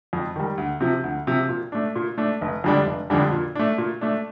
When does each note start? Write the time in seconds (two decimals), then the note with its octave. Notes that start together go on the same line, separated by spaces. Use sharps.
0.13 F2
0.36 D#3 G3
0.58 D2
0.81 C3 F3
1.04 D2
1.27 C3 F3
1.49 A#2
1.72 A3 D4
1.96 A#2
2.18 A3 D4
2.41 F1
2.64 F2 D3 G3 D4
2.86 F1
3.10 F2 D3 G3 D4
3.32 A#2
3.55 A3 D4
3.78 A#2
4.01 A3 D4